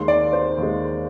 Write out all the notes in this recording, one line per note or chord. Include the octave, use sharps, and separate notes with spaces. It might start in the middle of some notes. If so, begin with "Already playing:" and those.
Already playing: D#2 D#3 G#3 C6
D5
C5
D#2 D#3 G#3